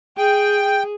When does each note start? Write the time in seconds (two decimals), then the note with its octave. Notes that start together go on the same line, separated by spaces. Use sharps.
0.17 G#4 G5